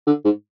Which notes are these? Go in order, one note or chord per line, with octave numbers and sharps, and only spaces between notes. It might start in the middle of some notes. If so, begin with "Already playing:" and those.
D3
G#2